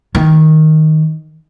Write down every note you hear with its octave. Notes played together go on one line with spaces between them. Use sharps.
D#3